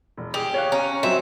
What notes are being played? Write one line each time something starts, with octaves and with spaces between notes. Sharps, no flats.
E1
G4 G#4 D#6 F7
C#5 F5 F#6
C#4 A#5
F#3 C4 E5